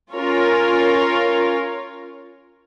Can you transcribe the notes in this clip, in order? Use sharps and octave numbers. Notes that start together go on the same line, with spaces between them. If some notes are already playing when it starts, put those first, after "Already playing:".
C#4 F4 A#4 C#5